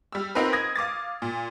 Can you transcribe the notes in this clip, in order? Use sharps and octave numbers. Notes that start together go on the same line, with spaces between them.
G3 E6
B3 C4 D#4 F4 A#4 B4
D#6 G#6 A#6
F5 D6 D#6 A6
A#2